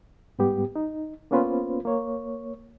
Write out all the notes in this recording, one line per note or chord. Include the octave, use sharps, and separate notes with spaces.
G#2 G3 B3 G4
D#4
A#3 B3 C#4 F4 B4 C5
A#3 C#5